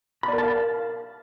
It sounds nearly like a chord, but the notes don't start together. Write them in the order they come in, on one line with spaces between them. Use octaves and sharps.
B5 D5 A#4 A5 F5